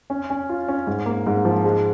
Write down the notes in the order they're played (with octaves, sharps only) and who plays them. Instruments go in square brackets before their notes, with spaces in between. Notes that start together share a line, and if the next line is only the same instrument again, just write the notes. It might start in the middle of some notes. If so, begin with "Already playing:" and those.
[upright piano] C#4
C#4
F4
C#4
G#2
A#3
G#2
F3
G#3